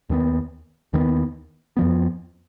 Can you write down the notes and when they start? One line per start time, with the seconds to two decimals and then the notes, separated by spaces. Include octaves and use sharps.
0.09 D#2 D#3 G#3 B3
0.93 D#2 D#3 G#3 B3
1.77 F2 F3 B3